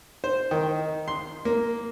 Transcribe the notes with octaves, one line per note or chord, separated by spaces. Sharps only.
C5
D#3
C6
A#3